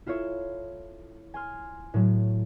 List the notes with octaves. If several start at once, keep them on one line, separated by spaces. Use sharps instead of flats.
E4 F4 A4 C#5 E5
G#5 C6 F6
A2 F#3